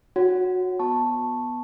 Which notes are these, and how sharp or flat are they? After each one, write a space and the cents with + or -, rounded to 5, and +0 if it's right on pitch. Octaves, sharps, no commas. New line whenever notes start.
F#4 -20 C#5 +0 F#5 +10
B3 +0 A5 +0 C#6 -10